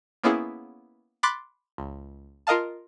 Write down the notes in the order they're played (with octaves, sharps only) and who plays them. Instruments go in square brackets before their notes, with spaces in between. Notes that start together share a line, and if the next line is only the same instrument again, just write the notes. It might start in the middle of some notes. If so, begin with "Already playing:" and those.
[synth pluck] A#3 B3 C#4 E4 G#4
B5 C6 D6 F#6 A6 B6
C#2
F4 A#4 D#5 F5 A5